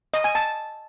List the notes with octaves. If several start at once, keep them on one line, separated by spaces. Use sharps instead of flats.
D#5
G#5
A5